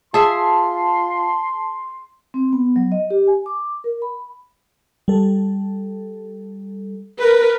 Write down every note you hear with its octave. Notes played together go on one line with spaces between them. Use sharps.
F4 G#4 E5 A5 C6 C7
C4
B3
F#3
D#5
G4
G#5
D6
A#4
B5
G3 A4
A#4 B4